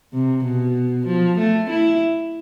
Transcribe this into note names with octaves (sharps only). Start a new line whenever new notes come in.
C3
B2
F3
A3
E4